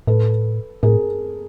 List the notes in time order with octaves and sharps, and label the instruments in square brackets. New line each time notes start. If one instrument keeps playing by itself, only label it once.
[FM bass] A2 [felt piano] A4 B4
[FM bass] A2 [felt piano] G#4 A#4